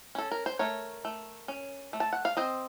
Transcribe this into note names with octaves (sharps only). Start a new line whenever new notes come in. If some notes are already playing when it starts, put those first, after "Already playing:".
C#4 A4
A#4
C5
A3 A#4 C#5
A3
C#4
A3
A5
F#5
F5
C4 C5 D#5